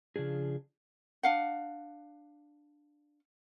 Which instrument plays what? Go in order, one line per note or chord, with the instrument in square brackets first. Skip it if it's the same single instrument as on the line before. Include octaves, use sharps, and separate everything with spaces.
[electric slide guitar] C#3 F3 D4 G#4
[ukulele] D4 F5 F#5